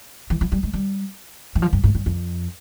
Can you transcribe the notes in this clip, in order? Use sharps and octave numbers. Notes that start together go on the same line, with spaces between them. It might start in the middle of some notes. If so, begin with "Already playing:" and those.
E3
F3
G3
G#3
G3
E3
F3
G2
G#2
G2
F2